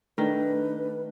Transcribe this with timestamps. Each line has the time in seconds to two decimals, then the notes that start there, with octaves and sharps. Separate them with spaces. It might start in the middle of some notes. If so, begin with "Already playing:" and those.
0.18 D#3 A3 D4 B4